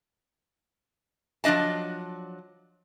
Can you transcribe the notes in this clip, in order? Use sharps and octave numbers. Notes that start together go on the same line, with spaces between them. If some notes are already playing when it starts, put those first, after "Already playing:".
F3 F#3 D4 D#5 A5